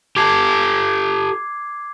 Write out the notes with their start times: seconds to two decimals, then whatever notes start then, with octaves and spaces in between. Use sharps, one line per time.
0.16 G4 A4 D6 G#6 C7